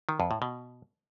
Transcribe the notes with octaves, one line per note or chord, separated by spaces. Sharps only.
D#3
F2
A2
B2